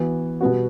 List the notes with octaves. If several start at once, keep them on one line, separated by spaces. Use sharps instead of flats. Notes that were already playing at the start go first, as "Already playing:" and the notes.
Already playing: E3 B3 F#4
B2 G3 B3 F#4